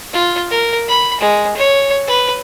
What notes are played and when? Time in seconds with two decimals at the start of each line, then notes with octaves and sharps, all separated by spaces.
0.13 F4
0.50 A#4
0.87 B5
1.20 G#3
1.56 C#5
2.07 B4